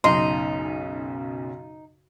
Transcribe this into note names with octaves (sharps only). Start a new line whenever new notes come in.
B1 F#2 C#3 D#4 D#5 C6